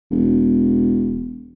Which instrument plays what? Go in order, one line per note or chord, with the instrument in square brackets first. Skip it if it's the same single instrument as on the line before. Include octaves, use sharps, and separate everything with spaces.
[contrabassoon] E1